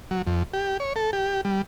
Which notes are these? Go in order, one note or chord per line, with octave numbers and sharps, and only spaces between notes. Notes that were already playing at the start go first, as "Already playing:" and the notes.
F#3
F2
G4
C#5
A4
G4
G3